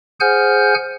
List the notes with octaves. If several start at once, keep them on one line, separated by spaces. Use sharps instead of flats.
G#4 C5 F#5 G#5 F6 G6